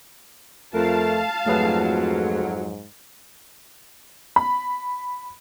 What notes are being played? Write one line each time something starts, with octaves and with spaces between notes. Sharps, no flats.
F2 A3 A#4 F5 A5
F2 G#2 F#3 A3 G#4 B4
B5